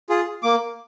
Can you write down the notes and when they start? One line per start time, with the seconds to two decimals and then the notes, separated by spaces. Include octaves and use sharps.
0.09 F4 G#4
0.43 A#3 D6